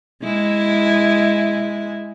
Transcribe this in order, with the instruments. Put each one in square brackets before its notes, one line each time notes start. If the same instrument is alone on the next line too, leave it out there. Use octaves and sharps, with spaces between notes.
[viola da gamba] G#3 E4